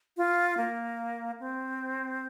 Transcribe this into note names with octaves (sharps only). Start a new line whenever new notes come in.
F4
A#3
C4